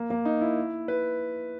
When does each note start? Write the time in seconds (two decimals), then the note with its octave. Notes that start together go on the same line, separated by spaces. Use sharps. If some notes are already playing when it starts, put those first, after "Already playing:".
Already playing: A#3
0.10 A#3
0.25 D#4
0.41 E4
0.88 B4